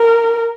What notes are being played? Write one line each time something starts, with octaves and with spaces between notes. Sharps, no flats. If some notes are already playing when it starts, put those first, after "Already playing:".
Already playing: A#4